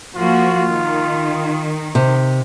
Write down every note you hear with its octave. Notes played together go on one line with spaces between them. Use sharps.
F3 A#3 F4 F#4
D#3
C3